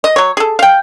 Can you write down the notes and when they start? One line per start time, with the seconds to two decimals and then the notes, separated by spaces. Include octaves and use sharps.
0.04 D#5
0.16 F#3 C#5
0.37 G#4 A4
0.59 F5 G5